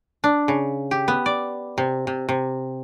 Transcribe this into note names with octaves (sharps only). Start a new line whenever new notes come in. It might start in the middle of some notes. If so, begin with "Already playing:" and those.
D4
C#3
G4
B3
D5
C3
C3
C3